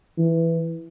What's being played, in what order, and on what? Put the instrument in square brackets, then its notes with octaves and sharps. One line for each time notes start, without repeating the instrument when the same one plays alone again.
[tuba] E3